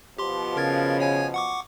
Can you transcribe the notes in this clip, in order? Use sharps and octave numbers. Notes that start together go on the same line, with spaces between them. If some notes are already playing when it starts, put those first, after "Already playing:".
B2 F3 G4 C6
C#3 A#4 G#6 A6
C#5 G#5 G#6
F#5 C#6 D6